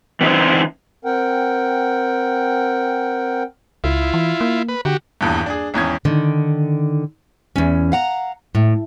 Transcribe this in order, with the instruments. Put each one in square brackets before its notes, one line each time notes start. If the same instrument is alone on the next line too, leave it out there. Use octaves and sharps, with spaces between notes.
[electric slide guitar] E3 C4 C#4 D#4 E4 C5
[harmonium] C4 A#4 F#5 G5
[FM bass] C#2 [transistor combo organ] E4 F4
[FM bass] E3
A#3
[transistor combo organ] B4
[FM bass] D3 [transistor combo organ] F#4 G4
[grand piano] D#1 E2 G2
D4 G#4
G#1 E2 C#4 G#6
[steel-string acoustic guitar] D3 D#3
E2 C#4
F5 F#5 A#5
A2